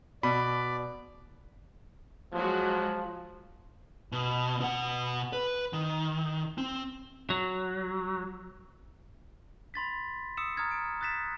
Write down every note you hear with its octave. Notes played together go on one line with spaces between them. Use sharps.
B2 D5 B5
F3 F#3 G#3 F#4
B2
B2 F#5
B4
D#3
C4
F#3
B5 C6 A6 B6
D#6 E6 C#7 E7
A#5 D#6 F6 G#6 A6
D7
D#6 F#6 A6 B6 E7